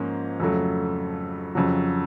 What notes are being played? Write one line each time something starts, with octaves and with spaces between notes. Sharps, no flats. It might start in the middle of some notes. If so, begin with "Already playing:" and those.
Already playing: G#2 F3 A#3 C#4
F2 C#3 F#3 A3
F2 C#3 F#3